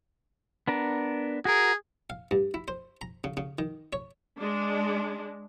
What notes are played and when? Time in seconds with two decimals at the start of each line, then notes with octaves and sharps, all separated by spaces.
0.68 B3 D4 A#4
1.45 F#4 G#4 A#4
2.10 F5
2.31 G2
2.54 E4
2.68 C5
3.01 A#5
3.24 C#3
3.37 C#3
3.59 D#3
3.93 C#5
4.38 G#3 D4